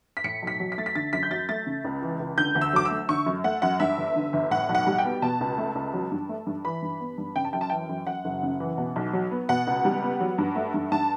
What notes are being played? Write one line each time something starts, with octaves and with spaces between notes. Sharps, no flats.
B6
A2 C#7
B1 B6
F#3
B6
A3 A6
B6
D3 A6
F#2 B6
G6
F#3 A6
A3 A6
C#3
C#2
E3
C#2
D3 G6
D2
E6
F#3 D6
E6
A3
D3 C#6
F#2
A3 F#5
F#2 F#5
G2 E5
G1
D3
G1
A2 F#5
B1
F#5
G3
G5
B3
B2 A5
C#2
A3
C#2
F#3
G2
A3
G2
E3 B5
G2
B3
G2
C#3 G5
A5
F#2 G5
A5
E3 G5
F#2
F#2 F#5
F#1
C#3
E3
B2
B1
F#3
B3
B2 F#5
C#2
G3
B3
F#3
G2
A3
G2
G2 A5